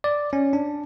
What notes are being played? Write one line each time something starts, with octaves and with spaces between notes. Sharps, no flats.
D5
C#4
D4